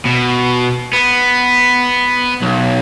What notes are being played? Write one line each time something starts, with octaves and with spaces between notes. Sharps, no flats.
B2
B3
B1